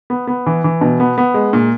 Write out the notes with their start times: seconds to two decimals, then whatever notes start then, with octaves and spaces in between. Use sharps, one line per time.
0.10 B3
0.27 B3
0.46 E3
0.64 E3
0.81 B2
1.00 B3
1.18 B3
1.34 G#3
1.53 A#2